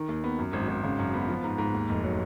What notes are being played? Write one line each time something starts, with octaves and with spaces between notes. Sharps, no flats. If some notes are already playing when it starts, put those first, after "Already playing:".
Already playing: D#3
D#2
B3
F#2
G#1
G#1
C#3
F#2
B3
F3
G#2
G#2
D#2
F1
F#3